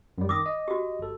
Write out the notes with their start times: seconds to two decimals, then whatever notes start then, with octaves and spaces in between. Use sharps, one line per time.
0.18 F#2 G3
0.29 D#3 D6 D#6 A#6
0.46 D#5
0.68 F#4 G4
0.99 G1 A4